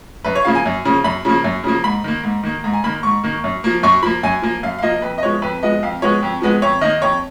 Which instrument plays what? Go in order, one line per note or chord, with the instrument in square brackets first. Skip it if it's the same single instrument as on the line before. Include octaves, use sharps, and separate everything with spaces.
[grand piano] F#2 B4
C#5
C#3 F3 A#3 F5
G#5
F#2
C#3 F3 A#3
F#2 B5
C#3 F3 A#3
F#2
C#3 F3 A#3
G#2 B5
D#3 A#3
G#2
D#3 A#3
G#2 A#5
G#5
D#3 A#3 B5
G#2 C#6
D#3 A#3
F#2
F3 A#3
F#2 C#6
F3 A#3 B5
F#2 G#5
F3 A#3
F#2 F5
F5
F3 A#3 D#5
F2 B4
D#5
F3 G#3 B3 C#5
F2 B4
F3 G#3 B3 D#5
F2 F5
F3 G#3 B3 C#5
F2
F3 G#3 B3
F2 C#5
D#3 A#3 D#5
F2 C#5